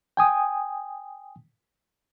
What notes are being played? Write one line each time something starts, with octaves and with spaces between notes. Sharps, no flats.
G5 G#5 D#6